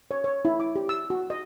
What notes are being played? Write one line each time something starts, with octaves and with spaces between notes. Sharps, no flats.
C#5
C#5
E4
D6
G4
E6
F#4
D#5